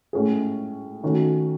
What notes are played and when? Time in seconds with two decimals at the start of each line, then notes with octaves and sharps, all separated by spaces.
0.13 A2 G#3 C#4 G#4
1.03 D#3 A3 C#4 F#4